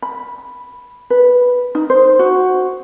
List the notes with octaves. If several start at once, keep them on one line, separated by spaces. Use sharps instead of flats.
B5
B4
D#4
C5
F#4